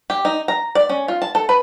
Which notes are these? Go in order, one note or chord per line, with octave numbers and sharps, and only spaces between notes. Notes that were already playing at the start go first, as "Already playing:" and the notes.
G4
D#4
A#5
D5
C#4
F4
A5
A4
B4